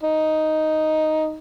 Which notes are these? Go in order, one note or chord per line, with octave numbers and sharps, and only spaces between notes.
D#4